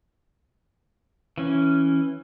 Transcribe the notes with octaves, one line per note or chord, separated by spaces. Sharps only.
E3 C#4